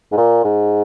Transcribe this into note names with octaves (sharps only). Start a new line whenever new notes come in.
G#2
A#2
G#2